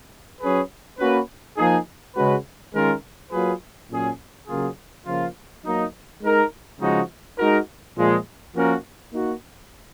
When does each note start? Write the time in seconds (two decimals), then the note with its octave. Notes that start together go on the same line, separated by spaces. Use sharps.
0.40 F#3 C#4 G#4 B4
0.99 A#3 C#4 F#4 B4
1.57 F3 A#3 D#4 G#4
2.15 C#3 G#3 C#4 F#4 B4
2.73 D#3 G#3 C#4 F4 A#4
3.31 F#3 A#3 F4 G#4 B4
3.90 A#2 F#3 C#4 G#4
4.47 C#3 F#3 A#3 F4 G#4
5.06 C#3 F3 A#3 F4
5.64 F#3 A#3 D#4
6.22 G#3 D#4 A#4
6.79 C#3 F3 G#3 D#4 F#4
7.38 G#3 D#4 F#4 A#4
7.96 A#2 F3 G#3
8.54 F3 A#3 C#4 F#4 A#4
9.12 A#3 D#4 F#4